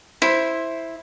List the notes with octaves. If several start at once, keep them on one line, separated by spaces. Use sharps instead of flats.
E4 C5 C6